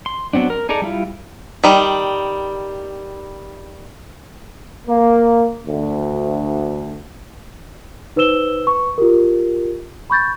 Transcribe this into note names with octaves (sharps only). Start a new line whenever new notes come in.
C6
F#3 B3 C4 D4
A#4
D#4 G#4 A4 D5 A#5
G3 E4 F4
D#3 G3
A#3
D2
D#4 B4 C5 E6 E7 G7
B4 C#6
F4 G4 A#4
B5 C#6 G6 A6